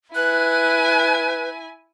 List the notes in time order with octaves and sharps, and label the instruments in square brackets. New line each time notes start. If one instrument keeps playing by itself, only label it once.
[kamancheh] E4 G#5 [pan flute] B4 [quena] F#6